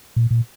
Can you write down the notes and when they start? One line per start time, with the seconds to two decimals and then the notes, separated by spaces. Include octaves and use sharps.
0.16 A#2
0.31 A#2